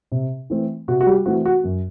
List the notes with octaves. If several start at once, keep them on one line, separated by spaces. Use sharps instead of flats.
C3
E3 A3 C4
C3 F#4
F#4
G3 G4
E3 A3 C4 F#4
F#4
F#2